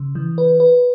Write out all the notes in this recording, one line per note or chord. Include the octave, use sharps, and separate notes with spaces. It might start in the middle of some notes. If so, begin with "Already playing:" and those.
Already playing: C#3
E3
B4
B4